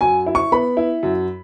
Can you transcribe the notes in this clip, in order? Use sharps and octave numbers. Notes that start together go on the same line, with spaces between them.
F#2 G#5
E4
C#6
B3 B5
E4
F#2